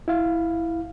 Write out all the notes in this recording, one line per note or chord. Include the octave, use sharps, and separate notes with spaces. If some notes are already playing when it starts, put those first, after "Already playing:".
E4 F5